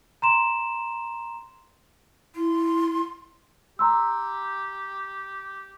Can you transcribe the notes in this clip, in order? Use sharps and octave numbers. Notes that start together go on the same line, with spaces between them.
A#5 C6 E7
E4 C6
G4 A#5 C6 E6